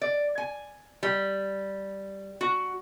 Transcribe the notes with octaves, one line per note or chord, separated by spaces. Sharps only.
D5
G#5
G3
F#4